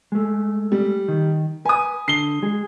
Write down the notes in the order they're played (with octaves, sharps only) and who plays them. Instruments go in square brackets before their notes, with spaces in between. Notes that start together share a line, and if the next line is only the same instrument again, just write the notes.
[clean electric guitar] G#3 A3
[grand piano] G3
[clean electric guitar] D#3
[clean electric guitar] B4 [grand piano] G#5 D#6
[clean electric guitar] D3 [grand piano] C7 G7
[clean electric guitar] G#3 G#4